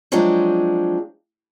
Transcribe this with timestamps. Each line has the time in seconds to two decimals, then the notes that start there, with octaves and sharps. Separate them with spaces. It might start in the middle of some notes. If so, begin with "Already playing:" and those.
0.12 F3 F#3 G#3 C4 D4